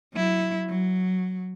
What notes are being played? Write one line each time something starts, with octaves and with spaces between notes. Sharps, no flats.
F#3 E4
F#3